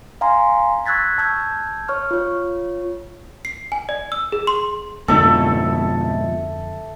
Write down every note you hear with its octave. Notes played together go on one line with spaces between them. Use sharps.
F5 G#5 A#5 C6
C#6 E6 F#6 G#6 A6 B6
A5 E6 G6 G#6
C#5 C#6 F6
F4 C#5
C7
G#5
D5
E6
G#4
C6
F2 G#2 B2 D3 F3 D4 A4 E5